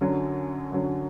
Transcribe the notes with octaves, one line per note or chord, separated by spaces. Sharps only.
F#2 D3 F#3
F#2 D3 F#3